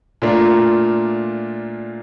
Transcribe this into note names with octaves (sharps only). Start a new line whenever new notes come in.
A#2 A3 D4 F4 A#4